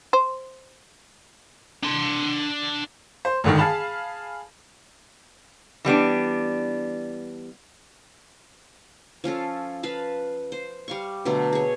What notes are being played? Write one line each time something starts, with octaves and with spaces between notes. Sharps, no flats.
C5
D4 C6
C5
G#1 D3 D#3
G#4 F5 A5 B5
E3 G3 B3 D4
F3 C#4 F4 A4
B4 F5 A5 B5
C5
G3 F5 C#6
B2 D3 F#3 A3
G#4 C#5